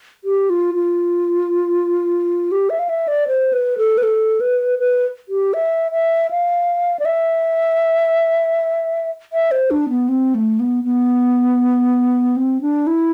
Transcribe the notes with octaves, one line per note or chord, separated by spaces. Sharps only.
G4
F4
F4
G4
E5
F5
E5
D5
C5
B4
A4
B4
A4
B4
B4
G4
E5
E5
F5
D5
E5
E5
C5
D4
B3
C4
A3
B3
B3
C4
D4
E4